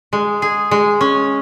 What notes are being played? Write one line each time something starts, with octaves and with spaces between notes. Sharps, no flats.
G#3
G#4
G#3
C#4